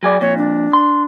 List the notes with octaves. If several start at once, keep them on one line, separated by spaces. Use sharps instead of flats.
F#3 G#4 D5
F2 A#2 C#5
D4
C6